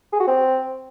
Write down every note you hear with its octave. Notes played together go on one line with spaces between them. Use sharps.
G#4
F#4
C4